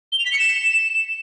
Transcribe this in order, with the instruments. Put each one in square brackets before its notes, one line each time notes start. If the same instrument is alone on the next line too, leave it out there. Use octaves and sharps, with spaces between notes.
[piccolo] G7
F7
B6
C#7
E7